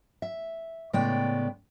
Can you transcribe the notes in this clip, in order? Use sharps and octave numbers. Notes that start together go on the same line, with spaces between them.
E5
A2 C#3 G#3 B3 D5 G5